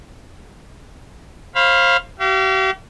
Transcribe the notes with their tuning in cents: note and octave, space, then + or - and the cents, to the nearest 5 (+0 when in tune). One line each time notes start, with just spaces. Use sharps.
C5 +35 F5 +0 B5 +0
G4 -45 F5 -35